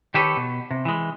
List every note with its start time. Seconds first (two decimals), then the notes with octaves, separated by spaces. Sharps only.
0.14 D#3 G4 A4 B4 C#5
0.37 B2
0.71 C3
0.85 E3 G#3